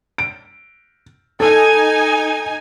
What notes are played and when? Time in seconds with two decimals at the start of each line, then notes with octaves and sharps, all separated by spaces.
0.18 D7
1.40 D#4 A4 G#5